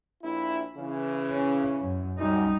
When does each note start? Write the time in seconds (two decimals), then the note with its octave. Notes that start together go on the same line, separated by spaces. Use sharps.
0.23 A#1 E4
0.77 C#3 E3
1.32 C#4
1.82 F#2
2.19 F#2 G3 D#4